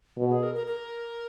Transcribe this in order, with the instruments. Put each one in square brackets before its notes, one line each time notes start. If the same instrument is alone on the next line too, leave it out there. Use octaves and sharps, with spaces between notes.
[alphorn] B2
[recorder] G#4
A#4
A#4
A#4